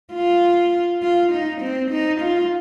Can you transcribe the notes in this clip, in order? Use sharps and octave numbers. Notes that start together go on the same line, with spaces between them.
F4
F4
D#4
C4
D#4
F4